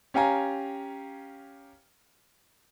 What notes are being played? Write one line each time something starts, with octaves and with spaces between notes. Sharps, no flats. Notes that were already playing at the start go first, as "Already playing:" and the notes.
C#4 G4 F5 G#5 A#5